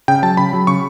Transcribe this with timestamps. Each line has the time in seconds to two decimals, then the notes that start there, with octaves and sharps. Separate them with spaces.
0.08 C#3 G5
0.22 F#3 A5
0.37 C#3 B5
0.53 F#3
0.67 C#3 C#6